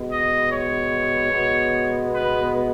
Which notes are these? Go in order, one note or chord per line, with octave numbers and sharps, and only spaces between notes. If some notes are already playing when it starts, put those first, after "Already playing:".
Already playing: B2 G#3 B3
D#5
C#5
B2 G#3 B3
B4